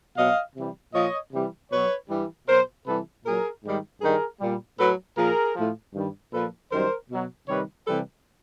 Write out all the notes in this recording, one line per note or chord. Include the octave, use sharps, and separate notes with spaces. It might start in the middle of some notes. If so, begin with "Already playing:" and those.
B2 F#3 D#5 F5
C3 E3 G3
A#2 F3 C#5 D#5
C3 E3 G3
B2 F#3 B4 C#5
G2 E3 G3
B2 F#3 A#4 C5
C3 E3 G3 A4 B4
A#2 F#3 G#4 A#4
G#2 D#3 G3
G2 D#3 G3 G#4 A#4
A#2 G3
A2 F#3 A4 B4
A#2 F3 G#4 A#4
A2 F3
G2 D#3 G3
A#2 F3 A4 B4
F#2 D#3 G3 A#4 C5
B2 F#3
C3 D#3 G3 B4 C#5
C3 E3 G3 A4 B4